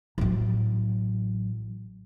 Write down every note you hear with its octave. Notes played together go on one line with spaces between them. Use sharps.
A1 F#3